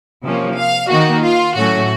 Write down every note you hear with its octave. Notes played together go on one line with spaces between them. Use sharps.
C3 F3 A#3 C#4
F5
D#3 A#3 D#4 F#4
F4
A2 F#3 A3 C#4 F#4